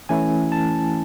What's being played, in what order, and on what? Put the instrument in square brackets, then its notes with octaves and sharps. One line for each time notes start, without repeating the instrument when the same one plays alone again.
[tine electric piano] E3 A3 C#4 E4 G#5
A5